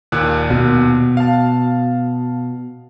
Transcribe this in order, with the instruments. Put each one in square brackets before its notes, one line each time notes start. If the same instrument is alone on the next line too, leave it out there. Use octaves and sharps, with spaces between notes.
[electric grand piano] D#2 A#2 F#6
[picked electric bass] B2
[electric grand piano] F5 A5